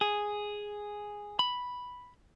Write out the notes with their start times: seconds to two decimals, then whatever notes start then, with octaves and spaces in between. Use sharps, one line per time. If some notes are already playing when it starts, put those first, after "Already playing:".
0.01 G#4
1.39 B5